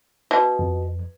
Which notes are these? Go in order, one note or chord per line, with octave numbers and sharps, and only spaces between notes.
B2
F2